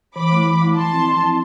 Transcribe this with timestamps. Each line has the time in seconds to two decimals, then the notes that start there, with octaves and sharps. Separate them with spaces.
0.16 E3 B5 D6
0.31 A3 E4
0.47 E3
0.62 A3 E4
0.77 F3 A5 C6
0.92 C4 E4
1.08 F3
1.23 C4 E4